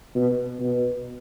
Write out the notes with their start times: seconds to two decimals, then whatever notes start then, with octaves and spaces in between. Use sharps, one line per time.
0.15 B2
0.59 B2